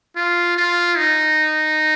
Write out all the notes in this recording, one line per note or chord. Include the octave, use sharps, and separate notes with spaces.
F4
F4
D#4